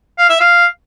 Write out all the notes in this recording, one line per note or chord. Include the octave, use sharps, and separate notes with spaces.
F5
E5
F5